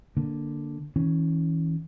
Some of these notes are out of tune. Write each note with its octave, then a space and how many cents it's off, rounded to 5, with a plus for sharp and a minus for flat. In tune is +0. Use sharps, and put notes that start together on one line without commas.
D3 +0 A#3 +0
E3 -35 C#4 +0